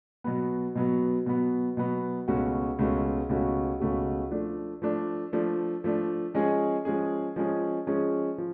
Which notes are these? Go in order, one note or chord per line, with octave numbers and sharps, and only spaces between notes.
B2 F#3 B3
B2 F#3 B3
B2 F#3 B3
B2 F#3 B3
C#2 B2 A3 C#4 F#4
C#2 B2 A3 C#4 F#4
C#2 B2 A3 C#4 F#4
C#2 B2 A3 C#4 F#4
F3 A3 D4
F3 A3 D4
F3 A3 D4
F3 A3 D4
F3 G#3 C#4 G#4
F3 G#3 C#4 G#4
F3 G#3 C#4 G#4
F3 G#3 C#4 G#4
F3